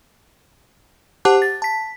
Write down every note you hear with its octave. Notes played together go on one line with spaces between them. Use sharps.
G4 C5 F#5 A5 D6 F#6
A6
A5 B6